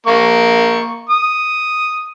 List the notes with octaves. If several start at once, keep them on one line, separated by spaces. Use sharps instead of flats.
A#3 C#6
D#6